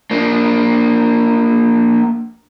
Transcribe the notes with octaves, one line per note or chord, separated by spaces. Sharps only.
A#3 D4